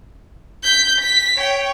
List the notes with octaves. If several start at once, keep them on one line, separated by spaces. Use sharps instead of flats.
G6 B6
B6
C#5 G5